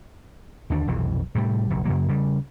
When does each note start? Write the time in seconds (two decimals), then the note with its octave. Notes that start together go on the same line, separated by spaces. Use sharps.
0.70 D#2 D3 D4
0.87 F1 B1 F2 E3
1.35 A2 C3 F3 G3
1.70 F#1 B1
1.85 F#2 C#3 F#3 A#3
2.09 C#3 G3